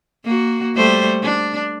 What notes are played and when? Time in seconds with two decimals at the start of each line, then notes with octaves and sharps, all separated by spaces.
0.25 A#3 F#4
0.75 G3 A3 C5
1.23 D4